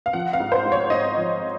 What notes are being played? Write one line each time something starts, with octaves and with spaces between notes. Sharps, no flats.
F5
F3 F#5
F5
G#2
C5
G#2
C#5
G#2 D#5
F3